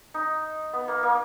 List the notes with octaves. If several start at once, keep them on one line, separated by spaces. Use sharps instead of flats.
D#4
B3
A#3
A#3